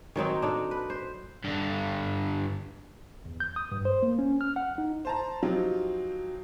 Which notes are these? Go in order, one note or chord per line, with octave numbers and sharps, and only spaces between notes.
D#3 F#3 C4 D#4
D4 D#4 A4
B4
C5
G2 D3
E2
G6
D#6
G2
C5
A#3
C#4
F6
F#5
D#4
C5 A5 A#5
F3 F#3 C4 D#4 F4 G4